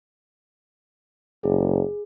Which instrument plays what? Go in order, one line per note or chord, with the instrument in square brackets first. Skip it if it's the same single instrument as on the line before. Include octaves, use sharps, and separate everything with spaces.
[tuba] F#1 [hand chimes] G#4